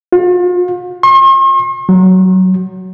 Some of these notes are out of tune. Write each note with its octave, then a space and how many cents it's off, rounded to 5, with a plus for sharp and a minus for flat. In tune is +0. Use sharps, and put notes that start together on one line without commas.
F4 +40
C6 +45
F#3 +10